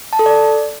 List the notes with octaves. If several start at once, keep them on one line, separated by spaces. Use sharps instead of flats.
A5
A4
D5